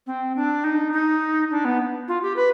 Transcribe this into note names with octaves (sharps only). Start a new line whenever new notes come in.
C4
D4
D#4
D#4
D4
B3
F4
G4
B4